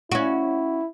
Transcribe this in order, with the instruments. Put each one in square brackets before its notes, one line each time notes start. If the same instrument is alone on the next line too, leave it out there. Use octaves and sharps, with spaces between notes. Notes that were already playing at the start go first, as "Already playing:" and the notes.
[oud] C#4 F#4 [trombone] E4